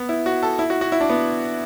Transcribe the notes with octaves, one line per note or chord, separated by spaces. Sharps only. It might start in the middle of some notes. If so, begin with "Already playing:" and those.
Already playing: B3
E4
F#4
A4
E4
F#4
F#4
E4
D4
B3